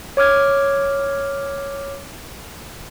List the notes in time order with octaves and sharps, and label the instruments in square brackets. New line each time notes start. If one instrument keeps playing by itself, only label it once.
[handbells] C#5 D6 F6 G#6